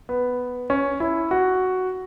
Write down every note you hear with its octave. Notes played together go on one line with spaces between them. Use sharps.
B3
C#4
E4
F#4